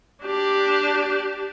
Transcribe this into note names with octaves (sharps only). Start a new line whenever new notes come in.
D4 G4